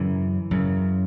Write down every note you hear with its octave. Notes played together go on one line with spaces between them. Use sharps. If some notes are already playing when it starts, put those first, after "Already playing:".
Already playing: F#2 C#3 E3
F#2 C#3